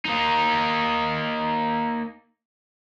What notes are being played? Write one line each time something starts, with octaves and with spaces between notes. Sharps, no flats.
A#3 D#4